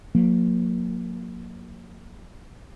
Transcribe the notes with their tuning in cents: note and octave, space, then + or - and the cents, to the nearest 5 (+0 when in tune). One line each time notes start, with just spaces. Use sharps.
F#3 -45 A#3 -5